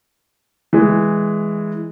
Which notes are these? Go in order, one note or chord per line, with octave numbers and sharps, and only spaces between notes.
E3 G#3